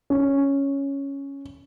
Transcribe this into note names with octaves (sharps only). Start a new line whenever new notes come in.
C#4